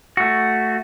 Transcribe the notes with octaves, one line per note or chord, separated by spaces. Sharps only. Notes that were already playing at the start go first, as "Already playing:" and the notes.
A3 F#4